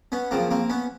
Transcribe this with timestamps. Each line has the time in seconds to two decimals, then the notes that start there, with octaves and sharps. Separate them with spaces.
0.12 B3 C#4
0.31 F#2 C#3 F3 A#3 C4
0.51 A#3 C4
0.70 B3 C#4